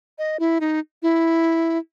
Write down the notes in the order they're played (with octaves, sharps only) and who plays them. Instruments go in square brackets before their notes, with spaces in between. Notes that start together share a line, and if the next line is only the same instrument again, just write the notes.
[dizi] D#5
E4
D#4
E4